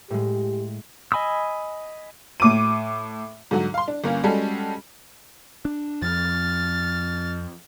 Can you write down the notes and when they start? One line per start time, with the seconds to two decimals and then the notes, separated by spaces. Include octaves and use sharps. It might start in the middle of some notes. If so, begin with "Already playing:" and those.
0.10 A2 G#3 G4
1.12 D#5 G#5 B5 D#6 E6
2.40 A2 D6 D#7
3.51 G#2 D3 F#3 F#4
3.74 F5 C6
3.88 D4
4.04 G1 A#3 C#4
4.24 G3 G#3 C#4 F#4 G4 A4
5.65 D4
6.02 F2 F3 F6 A6